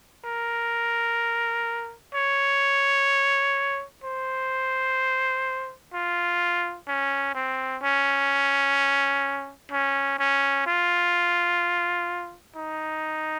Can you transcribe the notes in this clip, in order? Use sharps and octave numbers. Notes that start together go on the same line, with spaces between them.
A#4
C#5
C5
F4
C#4
C4
C#4
C#4
C#4
F4
D#4